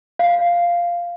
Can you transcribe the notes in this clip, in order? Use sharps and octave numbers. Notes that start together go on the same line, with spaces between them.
F5